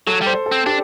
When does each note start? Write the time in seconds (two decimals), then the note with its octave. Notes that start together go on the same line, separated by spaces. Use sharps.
0.07 F#3 A4
0.22 G3 C5
0.46 A4
0.52 C4
0.66 D4 G4